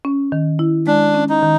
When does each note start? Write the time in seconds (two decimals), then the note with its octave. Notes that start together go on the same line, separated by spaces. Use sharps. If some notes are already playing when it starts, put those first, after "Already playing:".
0.05 C#4
0.32 D#3
0.59 E4
0.87 G#3 D4
1.14 C#4
1.29 D#4
1.42 D#3